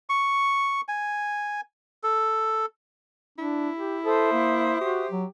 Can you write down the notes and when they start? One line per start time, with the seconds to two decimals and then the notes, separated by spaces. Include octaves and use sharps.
0.09 C#6
0.88 G#5
2.03 A4
3.38 D4 E4
3.78 G4
4.05 A4 C5 E5 D#6
4.33 A#3
4.81 F#4 G4
5.11 F#3